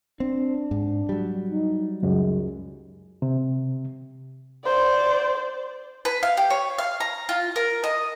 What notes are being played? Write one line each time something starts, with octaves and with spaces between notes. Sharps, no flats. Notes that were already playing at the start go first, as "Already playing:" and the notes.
C4 D4
G#2
F#3 G3
D#4
C#2 F#2 G#3
C3
C5 D5
B4
F5
G4
C#5
F5
A#5
F4
A#4
D#5